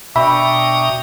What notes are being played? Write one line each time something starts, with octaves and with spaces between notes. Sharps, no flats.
B2 D4 E5 G5 A#5 B5 C#6 D#6